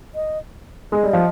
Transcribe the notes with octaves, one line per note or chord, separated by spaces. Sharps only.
D#5
G#3 D#5
G3
F3